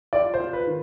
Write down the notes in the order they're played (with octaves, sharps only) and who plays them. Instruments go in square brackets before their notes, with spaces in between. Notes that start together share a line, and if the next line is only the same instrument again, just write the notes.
[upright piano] F4 [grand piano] D5
[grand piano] C5
[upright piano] F4
[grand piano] B4
[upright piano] D#3